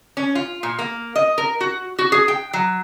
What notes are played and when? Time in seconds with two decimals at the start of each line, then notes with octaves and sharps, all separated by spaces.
0.17 C#4
0.35 F4
0.63 A#2
0.79 A#3
1.16 D#5
1.38 A#4
1.61 F#4
1.99 F#4
2.12 G#4
2.28 G5
2.53 F#3